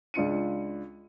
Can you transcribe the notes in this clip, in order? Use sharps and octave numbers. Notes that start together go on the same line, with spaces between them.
C#2 D4 F4 C#7 D#7